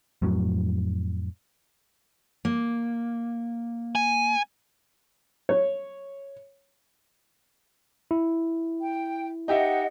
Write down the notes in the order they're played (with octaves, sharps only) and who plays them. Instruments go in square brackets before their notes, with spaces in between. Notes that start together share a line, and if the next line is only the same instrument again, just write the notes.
[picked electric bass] F2 A2 F#3
[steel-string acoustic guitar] A#3
[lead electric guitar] G#5
[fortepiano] C#5
[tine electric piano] E4
[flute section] G5
[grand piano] D#4 G4 E5 [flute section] D#5 F#5